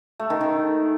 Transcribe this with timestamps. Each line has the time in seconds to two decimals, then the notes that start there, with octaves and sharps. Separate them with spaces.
0.19 A3
0.30 D#3
0.41 D#3